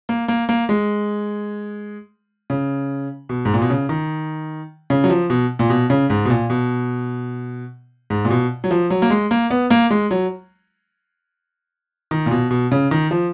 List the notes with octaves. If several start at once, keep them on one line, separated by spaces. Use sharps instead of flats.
A#3
A#3
A#3
G#3
C#3
B2
G#2
A#2
B2
C#3
D#3
C#3
F#3
F3
B2
A#2
B2
C#3
G#2
B2
A#2
B2
G#2
A#2
B2
F#3
F3
F#3
A#3
G#3
A#3
B3
A#3
G#3
F#3
D#3
A#2
B2
B2
C#3
D#3
F3